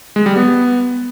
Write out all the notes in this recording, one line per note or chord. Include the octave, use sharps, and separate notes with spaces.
G#3
G3
B3